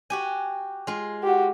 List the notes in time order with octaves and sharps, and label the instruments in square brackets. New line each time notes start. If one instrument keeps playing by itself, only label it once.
[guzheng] F#4 G4 G#5
G#3 F4
[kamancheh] F#4 G4